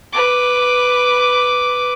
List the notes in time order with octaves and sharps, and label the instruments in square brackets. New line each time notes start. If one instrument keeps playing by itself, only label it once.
[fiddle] B4 D6